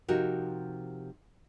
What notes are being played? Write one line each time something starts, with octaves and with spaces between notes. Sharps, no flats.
C3 F3 D#4 F#4 G4 A#4